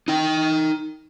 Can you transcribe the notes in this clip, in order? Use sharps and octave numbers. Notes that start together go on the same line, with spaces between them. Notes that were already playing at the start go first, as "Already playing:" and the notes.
D#4 G5